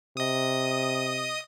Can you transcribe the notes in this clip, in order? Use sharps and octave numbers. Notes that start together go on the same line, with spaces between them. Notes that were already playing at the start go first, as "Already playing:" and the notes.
C3 D#5 D#6